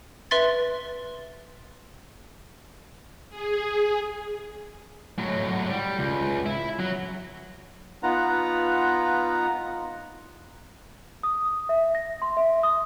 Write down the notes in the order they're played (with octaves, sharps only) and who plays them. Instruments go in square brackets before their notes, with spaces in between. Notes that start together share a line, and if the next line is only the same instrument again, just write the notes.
[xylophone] B4 E5 C6 A6
[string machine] G#4
[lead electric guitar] A2 F#3
G3
C#2
E4
F#3
[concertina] B3 D#4 F4 B4 F#5 A#5
[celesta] D#6
E5
A#6
C6
E5
D#6